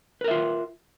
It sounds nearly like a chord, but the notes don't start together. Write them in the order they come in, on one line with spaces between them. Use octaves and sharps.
B4 A#4 E5 F4